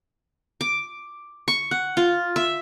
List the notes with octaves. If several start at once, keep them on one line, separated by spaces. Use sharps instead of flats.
D6
C#6
F#5
F4
E5